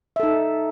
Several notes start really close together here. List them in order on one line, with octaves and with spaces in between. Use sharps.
E5 A4 D#4